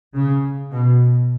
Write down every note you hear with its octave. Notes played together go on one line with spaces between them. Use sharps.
C#3
B2